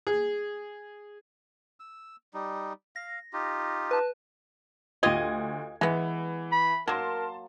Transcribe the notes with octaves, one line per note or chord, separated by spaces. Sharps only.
G#4
E6
G3 D#4
F5 A#6
D#4 F4 G4
B4 A5
D2 F4 G4 D#5 G#6
E3 G#3 B3
B5
F#3 A#3 A#4 A5 C6